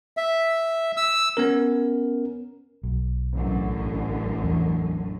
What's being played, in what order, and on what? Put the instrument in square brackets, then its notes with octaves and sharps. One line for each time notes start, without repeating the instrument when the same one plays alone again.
[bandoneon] E5
E6
[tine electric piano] B3 C#4 A#4
[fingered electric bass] B1
[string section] A1 F#2 D3
[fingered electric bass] E2